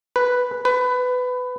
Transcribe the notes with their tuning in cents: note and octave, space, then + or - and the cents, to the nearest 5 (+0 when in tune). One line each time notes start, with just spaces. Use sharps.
B4 +0
B4 +20